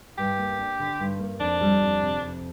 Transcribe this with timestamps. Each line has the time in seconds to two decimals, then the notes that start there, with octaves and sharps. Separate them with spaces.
0.18 G2 G4
0.38 A#3
0.59 D4
0.80 D3
0.99 G2
1.20 A#3
1.40 F2 D4
1.61 G3
1.82 F2
2.02 C3
2.22 F2